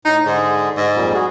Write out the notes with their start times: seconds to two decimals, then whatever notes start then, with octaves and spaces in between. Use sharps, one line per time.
0.05 A2 D#4
0.26 G#2 D3 G#4
0.76 G#2
0.96 F2 A#2 G3
1.14 F#4 G#4